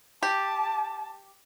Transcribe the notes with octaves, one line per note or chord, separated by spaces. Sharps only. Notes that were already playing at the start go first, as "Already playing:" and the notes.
G4 A5